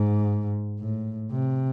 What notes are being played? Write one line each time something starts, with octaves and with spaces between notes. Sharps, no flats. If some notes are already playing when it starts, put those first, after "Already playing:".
Already playing: G#2
A2
C3